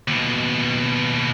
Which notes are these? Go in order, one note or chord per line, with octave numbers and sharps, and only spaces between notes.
D#2 B2